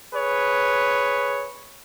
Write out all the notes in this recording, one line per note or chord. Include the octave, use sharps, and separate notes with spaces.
G#4 B4 C#5